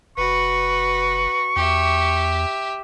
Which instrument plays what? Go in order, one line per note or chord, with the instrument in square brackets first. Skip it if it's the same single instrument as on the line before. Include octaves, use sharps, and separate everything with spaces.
[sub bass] F#1 [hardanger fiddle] F#4 B4 [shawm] C#6
[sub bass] E2 [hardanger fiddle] G4 E5